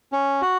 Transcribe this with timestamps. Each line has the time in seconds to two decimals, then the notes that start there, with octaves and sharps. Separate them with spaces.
0.12 C#4
0.42 F#4